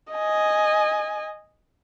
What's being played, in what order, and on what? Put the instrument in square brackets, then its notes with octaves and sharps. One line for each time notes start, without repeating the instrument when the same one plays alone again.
[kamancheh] D#5 G#5